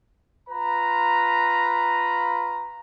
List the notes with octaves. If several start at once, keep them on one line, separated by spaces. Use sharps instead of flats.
F4 B4 A#5